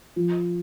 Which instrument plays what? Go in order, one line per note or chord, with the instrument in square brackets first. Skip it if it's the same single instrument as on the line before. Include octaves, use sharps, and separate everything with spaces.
[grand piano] F3